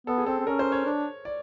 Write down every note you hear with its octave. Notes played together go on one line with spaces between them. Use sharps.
B3 A4
G#4
C4 A4
C4
C#4 A#4
C5
C#5
D4
D5